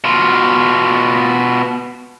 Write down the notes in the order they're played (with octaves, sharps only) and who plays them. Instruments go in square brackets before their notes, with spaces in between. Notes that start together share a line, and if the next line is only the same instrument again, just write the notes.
[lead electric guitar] B2 F4